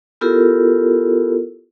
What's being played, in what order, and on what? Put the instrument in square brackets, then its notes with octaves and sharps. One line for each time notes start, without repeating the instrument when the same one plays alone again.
[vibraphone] B3 E4 F4 G4 A4 A#4